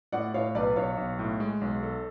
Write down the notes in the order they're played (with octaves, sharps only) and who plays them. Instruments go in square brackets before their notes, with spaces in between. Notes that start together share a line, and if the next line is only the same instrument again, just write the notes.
[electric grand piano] A2 [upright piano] D5 F#5
[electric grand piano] A2 [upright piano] C#5 F5
[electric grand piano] B1 [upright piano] B4 D5
[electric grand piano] B1 [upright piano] C#5 F5
[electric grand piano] B1
A2
G#3
B1
A4